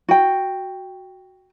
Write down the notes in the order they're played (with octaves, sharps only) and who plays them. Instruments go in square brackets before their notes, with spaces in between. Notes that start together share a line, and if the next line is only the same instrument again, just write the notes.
[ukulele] F#4 G5